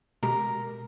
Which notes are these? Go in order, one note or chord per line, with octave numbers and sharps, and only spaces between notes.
B2 G#3 G4 A#4